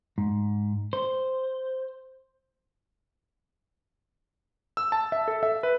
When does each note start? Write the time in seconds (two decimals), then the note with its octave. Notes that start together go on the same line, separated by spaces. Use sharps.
0.18 G#2
0.93 C5
4.77 E6
4.92 A5
5.12 E5
5.28 A4
5.43 E5
5.63 B4